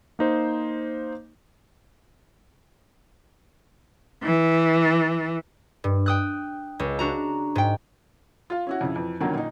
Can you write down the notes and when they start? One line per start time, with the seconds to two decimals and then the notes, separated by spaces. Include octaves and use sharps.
0.19 A#3 D#4 C5
4.23 E3
5.84 G2
6.06 G5 D#6 F#6
6.79 C#2
6.99 D4 F#4 A#5
7.55 G#2 G5
8.50 F4 F5
8.67 C#4 E4 F#4
8.81 F2 C#3 E4
8.96 F2 E3
9.21 F2 D3 D#3 F#3 A#3 C#4
9.34 A#2 D#4